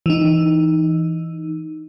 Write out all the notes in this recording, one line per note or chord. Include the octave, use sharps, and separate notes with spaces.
E3 D#4